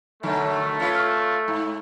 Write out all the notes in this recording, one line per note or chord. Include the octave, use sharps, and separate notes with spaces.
B2 D3 F#3 A3
C#4 F4 B4
G#2